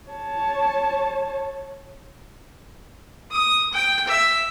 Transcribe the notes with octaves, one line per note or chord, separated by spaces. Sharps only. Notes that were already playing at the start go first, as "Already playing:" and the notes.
C#5 A5
D#6
G5
E5